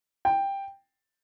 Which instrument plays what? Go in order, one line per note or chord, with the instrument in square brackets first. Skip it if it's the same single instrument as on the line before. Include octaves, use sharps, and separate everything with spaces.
[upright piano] G5